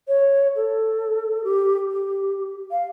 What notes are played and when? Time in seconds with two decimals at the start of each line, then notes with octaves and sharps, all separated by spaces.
0.08 C#5
0.56 A4
1.44 G4
1.90 G4
2.71 F5